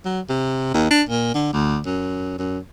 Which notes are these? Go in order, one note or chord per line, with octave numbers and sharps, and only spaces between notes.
F#3
C3
D#2
D4
A#2
D3
D2
F#2
F#2